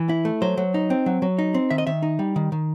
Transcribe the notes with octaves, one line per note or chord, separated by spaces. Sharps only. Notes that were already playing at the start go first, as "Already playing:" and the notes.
Already playing: E3
E4
A3
F#3 C5
F#3
D#4
C4
F#3
F#3
D#4
C4
D#3 E5
D#5
D#3 E5
D#4
G3
D#3
D#3